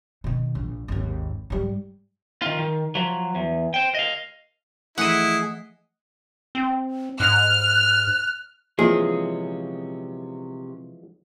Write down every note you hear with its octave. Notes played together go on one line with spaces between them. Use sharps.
B2 D#3
A#1
G#1 D#2
G#2 G3
D#3 F4
D#3
F3 F#3
E2
C5 G5
D#5 F5
E3 F3 A3 E4 G#4 D#5 F#5
C4
G#2 F6 F#6
C3 E3 F3 G#3 A#3 C#4 F4 G#4